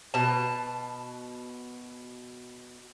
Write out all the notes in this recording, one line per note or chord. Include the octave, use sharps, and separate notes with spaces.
B2 A5